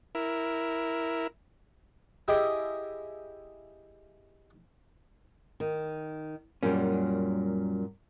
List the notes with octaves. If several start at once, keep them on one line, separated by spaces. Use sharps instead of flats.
E4 A#4
E4 G4 G#4 D#5 G5
D#3
F#2 A#2 G3 C#4